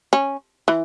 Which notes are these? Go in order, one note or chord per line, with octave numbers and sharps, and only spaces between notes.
C#4
E3